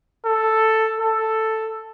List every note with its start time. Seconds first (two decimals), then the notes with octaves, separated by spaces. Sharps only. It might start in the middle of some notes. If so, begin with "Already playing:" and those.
0.25 A4
1.00 A4